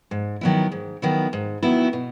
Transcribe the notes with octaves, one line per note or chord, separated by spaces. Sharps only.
G#2
D#3 F#3 B3 E4
G#2
D#3 F#3 B3 E4
G#2
D#3 F#3 B3 E4
B2